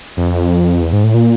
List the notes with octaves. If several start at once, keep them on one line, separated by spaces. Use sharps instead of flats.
F2
E2
G#2
A2
A#2